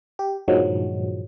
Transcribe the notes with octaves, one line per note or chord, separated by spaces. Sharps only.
G4
G2 A#2 D#3 F3 F#3 G#3